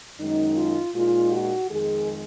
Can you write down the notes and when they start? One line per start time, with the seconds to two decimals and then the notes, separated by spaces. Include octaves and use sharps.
0.19 F#2 D#3 G#3 D#4
0.56 F4
0.94 A#2 G#3 D#4 F4
1.31 F#4
1.69 F2 D#3 G#3 G#4